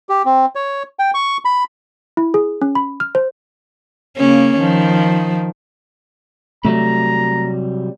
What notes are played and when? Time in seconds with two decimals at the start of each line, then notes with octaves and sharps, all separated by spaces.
0.09 G4
0.25 C4
0.55 C#5
0.99 G5
1.14 C#6
1.45 B5
2.17 E4
2.34 G#4
2.62 C#4
2.75 B5
3.00 F6
3.15 C5
4.18 C#3 A#3 C#4
4.58 D#3 F3
6.65 C3 F#3 G3 A3 A#5